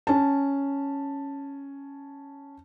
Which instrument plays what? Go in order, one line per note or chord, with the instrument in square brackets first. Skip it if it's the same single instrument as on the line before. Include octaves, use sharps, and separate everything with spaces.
[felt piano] C#4 A5